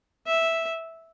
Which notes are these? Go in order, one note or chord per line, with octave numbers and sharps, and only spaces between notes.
E5